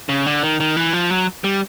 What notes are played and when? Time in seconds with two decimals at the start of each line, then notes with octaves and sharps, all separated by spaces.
0.09 C#3
0.26 D3
0.43 D#3
0.60 D#3
0.77 E3
0.93 F3
1.10 F#3
1.44 G3